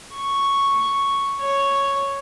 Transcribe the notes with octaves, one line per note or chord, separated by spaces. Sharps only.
C#6
C#5